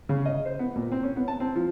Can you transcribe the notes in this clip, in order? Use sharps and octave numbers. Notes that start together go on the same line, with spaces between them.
C#3
D#5
C5
B3
A#2
C4
C#4
B3
A5
C4
F3